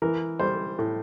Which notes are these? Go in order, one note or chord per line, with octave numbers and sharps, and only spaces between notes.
E3 A#4
G3 C5
A2